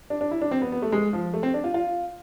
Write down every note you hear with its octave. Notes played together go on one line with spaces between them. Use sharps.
D4
D4
E4
D4
C4
B3
B3
A3
G#3
F3
A3
C4
D4
F4
F4